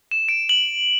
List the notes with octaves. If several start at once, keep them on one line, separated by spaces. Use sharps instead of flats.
E7
D7
F#7